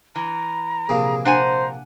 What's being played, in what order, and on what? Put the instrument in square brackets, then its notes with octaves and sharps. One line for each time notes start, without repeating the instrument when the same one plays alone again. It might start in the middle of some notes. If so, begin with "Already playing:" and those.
[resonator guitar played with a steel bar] E3 [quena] A#5
[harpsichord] A#1 C3 A#3 [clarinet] G#4
[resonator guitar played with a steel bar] D4 F#5 G#5 [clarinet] C5 [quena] A#5